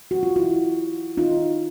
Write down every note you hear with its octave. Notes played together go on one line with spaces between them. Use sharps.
F#4
F4
E4 F#4
D#4 F4